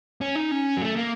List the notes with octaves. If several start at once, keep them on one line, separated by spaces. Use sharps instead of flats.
C#4
D#4
C#4
F#3
A3
A#3